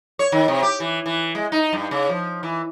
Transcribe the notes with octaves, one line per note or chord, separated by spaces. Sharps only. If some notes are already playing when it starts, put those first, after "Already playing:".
C#5
D#3
C3
G4
E3
E3
G#3
D#4
G2
C#3
F3
E3